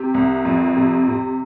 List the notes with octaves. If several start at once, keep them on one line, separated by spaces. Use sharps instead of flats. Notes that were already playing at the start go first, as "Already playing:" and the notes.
Already playing: C3 G4
C2
F2
C3
C3